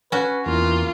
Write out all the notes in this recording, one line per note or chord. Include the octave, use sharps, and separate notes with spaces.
C#4 F#4 B4
E2 A#3 F4